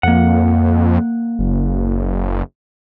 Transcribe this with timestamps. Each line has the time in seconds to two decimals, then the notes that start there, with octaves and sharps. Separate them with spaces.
0.03 F2 A#3 F#5
1.39 F#1